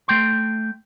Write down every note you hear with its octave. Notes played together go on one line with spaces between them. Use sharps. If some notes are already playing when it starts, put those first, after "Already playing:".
A3 G5 C6